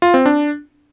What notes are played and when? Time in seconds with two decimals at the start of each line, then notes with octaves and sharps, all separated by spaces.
0.02 F4
0.14 C4
0.26 D4